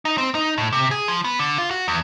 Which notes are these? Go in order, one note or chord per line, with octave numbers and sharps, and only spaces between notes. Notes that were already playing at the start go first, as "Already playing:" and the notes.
D#4
C4
D#4
A2
C3
G#4
F3
B3
D3
F4
F#4
E2